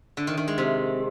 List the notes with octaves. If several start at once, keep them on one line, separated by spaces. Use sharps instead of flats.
D3
D#3
D#3
G#3
C3